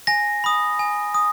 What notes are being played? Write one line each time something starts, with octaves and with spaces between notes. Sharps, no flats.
G#5 A#6
B5 D#6
G#5
D#6